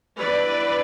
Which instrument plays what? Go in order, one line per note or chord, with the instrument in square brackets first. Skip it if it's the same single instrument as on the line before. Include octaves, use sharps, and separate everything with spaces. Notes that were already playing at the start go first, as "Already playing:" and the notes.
[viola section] E3 G3 B3 D4 B4 D5